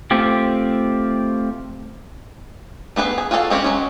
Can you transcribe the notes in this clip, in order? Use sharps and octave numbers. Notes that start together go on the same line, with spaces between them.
A3 C4 F4 G4
A3 B3 G#4 B4
G#4
F4 F#4 G#4 A4 F5
G#3 C4 C#4 G4
F#3 G#3 C#4